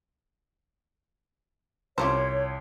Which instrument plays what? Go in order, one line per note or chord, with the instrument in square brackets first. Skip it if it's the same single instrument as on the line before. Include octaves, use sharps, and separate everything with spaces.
[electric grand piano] C2 D6 [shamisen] C#4 F4 C5 [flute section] C#5